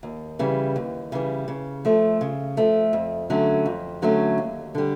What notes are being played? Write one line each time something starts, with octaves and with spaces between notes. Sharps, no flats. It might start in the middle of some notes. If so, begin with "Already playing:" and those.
D#2
C#3 E3 G3
D#2
C#3 E3 G3
C#3
F3 A3
C#3
F3 A3
F2
D3 F#3 A3 C#4
F2
D3 F#3 A3 C#4
D#2
D3 G3